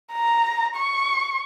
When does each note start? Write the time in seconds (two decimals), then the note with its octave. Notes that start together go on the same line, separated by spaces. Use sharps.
0.13 A#5
0.76 C#6